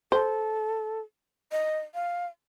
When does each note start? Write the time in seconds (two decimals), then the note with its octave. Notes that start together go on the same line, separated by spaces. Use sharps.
0.12 A4 C5
1.52 D#5
1.94 F5